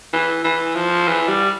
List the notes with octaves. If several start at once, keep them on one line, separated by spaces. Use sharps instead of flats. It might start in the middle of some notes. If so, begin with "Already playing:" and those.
E3
E3
F3
E3
G3